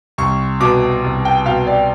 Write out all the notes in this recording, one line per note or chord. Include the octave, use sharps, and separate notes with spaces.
C2 C#6
B2 D6
C2
G5
B2 F5
D5